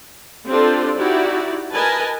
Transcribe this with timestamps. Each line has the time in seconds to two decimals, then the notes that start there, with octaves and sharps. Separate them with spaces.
0.49 C4 D4 F4 G4 A4 C5
0.99 D#4 E4 F#4 G4 D5
1.74 A#4 B4 D#5 G#5 A5